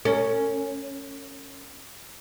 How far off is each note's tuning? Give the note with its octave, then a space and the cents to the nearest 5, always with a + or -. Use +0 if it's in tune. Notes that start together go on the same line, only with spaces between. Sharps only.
C#4 +0 A#4 -45